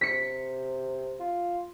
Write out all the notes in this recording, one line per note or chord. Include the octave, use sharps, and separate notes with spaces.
C3 B6 C#7
F4